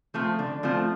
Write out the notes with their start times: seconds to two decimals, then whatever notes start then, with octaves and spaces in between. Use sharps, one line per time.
0.14 F3 A3 C4 F4
0.39 D3
0.63 F3 A3 C4 F4